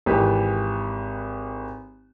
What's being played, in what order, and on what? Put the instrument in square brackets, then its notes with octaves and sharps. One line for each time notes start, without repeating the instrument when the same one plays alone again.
[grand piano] G#1 E3 G4 B4